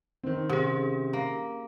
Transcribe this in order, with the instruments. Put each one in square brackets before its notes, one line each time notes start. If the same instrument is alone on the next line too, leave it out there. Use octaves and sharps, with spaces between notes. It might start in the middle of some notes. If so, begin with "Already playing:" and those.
[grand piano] D#3 C4
[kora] C3 [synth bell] C#4 G#4
[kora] A#3